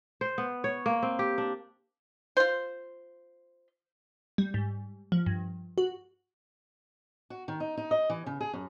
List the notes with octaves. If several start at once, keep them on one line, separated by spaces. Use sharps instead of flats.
C5
B3
C#5
A#3
C4
G4
D4
F4 C5
G3
G#2
F3
G2
F#4
F#4
D#3
D#4
D#4
D#5
E3
C#3
G#4
F#2